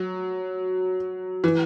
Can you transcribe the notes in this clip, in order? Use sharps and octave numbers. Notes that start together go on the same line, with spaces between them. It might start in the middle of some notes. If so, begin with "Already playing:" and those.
Already playing: F#3
E3